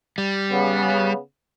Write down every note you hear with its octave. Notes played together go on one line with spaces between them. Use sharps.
G3
C#3 B3